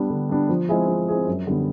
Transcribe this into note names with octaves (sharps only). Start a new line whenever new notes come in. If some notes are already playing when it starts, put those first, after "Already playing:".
Already playing: G3 B3 D4
D3
G3 B3 D4
F3
G#3 C4 E4 G#4
F3
G#3 C4 E4 G#4
F#2
D3 G3 B3